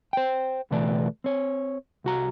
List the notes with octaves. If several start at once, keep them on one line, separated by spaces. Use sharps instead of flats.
C5 G5
C#2 B2 E3 A3 B4 D5
C4 C#5
C2 F#4 A#5